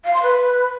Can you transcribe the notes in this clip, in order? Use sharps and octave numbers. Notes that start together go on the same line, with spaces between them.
F5
C6
B4